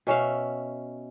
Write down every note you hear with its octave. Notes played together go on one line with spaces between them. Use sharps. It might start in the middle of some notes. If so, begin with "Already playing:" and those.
B2 C#4 E5 F5